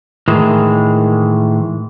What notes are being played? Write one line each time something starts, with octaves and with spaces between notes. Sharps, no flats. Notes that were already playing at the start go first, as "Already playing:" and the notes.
A2 D#3 E3 G#3